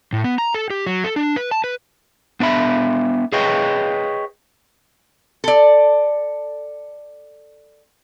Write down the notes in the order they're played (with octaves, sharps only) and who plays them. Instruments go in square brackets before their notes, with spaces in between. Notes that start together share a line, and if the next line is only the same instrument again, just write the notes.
[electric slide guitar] A2
B3
A#5
A4
G4
F#3
A4
D4
B4
A5
B4
[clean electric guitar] B3 D4 E5 B5
G#4 B4 C#5 D#5 G5
[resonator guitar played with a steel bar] A4 D5